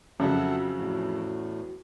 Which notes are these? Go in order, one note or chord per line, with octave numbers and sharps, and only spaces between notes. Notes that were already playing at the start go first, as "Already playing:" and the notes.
F2 C#3 F#3 C#4 F#4 A4 E5 F#5
E2 A2